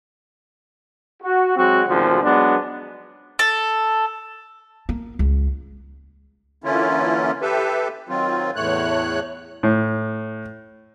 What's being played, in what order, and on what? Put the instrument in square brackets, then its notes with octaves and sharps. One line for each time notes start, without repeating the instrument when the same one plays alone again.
[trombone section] F#4
F#3 G#3 C4 F#4
G#1 D2 C#3 F3
F#3 G#3 B3 D4
[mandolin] A4
[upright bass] A#3
C#2
[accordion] D3 E3 A#3 C#4 E4 F4
G4 A4 B4 E5
D#3 F#3 C4 F4
E2 A2 A3 C#5 F#6
[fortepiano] A2